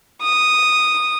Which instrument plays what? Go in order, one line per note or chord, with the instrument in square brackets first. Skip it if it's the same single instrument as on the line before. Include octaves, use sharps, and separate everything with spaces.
[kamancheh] D#6